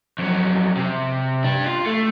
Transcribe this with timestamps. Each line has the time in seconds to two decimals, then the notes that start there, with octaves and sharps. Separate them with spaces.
0.19 F2 F#3
0.77 C3
1.44 D4 G4
1.66 F4
1.86 A3